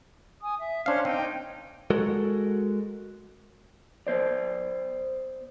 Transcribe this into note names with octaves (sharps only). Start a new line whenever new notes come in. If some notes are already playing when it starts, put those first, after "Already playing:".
G#5 D#6
E5
C#4 D4 C5 F5 F6
C4 D#4 G5
G#3 F#4 A4 A#4
B3 C5 D5